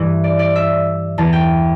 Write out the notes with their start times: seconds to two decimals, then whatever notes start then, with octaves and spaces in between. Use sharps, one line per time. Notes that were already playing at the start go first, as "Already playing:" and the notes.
Already playing: G2 E3 E5
0.24 D5
0.39 D5
0.56 E5
1.18 E2 E3 A5
1.33 G5